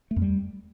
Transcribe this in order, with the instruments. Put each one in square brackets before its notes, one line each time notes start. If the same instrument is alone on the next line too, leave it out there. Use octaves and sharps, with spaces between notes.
[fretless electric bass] A3
F2
G3